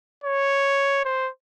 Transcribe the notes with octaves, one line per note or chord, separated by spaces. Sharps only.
C#5
C5